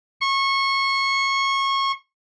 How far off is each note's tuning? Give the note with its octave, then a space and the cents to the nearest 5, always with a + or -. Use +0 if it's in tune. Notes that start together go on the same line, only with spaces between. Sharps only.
C#6 -25